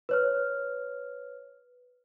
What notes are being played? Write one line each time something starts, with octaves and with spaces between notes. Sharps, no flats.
B4 C#5 F6